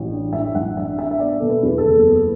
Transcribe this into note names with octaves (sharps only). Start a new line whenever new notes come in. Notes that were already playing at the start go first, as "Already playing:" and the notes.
Already playing: A1
D4
A2 E5
A1 F#5
D4 E5
D4 E5
E5
B3 D5
B2 A4
B4
E2
A4
F#1
B3